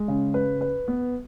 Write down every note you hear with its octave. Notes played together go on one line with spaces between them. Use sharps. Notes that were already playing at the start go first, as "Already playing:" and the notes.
Already playing: G#3
C#3
B4
B4
B3